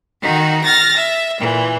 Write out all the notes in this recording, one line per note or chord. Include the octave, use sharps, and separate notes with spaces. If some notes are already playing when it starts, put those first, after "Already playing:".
D#3 D#4 F#4
F6 A6 A#6
E5
A#2 E3